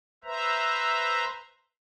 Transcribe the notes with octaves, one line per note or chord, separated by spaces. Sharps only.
B4 C5 E5 A#5